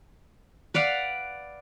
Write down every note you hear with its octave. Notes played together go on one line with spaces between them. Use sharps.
B4 D5 F5 F#5